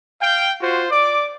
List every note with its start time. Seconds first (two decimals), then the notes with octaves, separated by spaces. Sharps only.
0.22 F5 G5
0.61 F4 F#4 C5
0.91 D5 D6